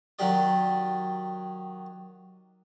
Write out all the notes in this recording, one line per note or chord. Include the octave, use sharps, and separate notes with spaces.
D#3 F#3 G4 D5